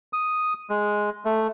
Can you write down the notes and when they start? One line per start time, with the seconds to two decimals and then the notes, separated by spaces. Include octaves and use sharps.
0.13 D#6
0.70 G#3
1.25 A3